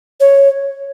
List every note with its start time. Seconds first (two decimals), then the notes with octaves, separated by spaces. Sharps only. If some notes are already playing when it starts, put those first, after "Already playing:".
0.20 C#5